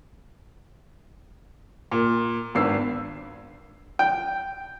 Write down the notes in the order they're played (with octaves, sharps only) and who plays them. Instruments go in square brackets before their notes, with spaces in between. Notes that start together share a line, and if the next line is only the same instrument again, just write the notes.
[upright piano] A#2
G#1 B3 D4 E6 C7
[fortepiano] G5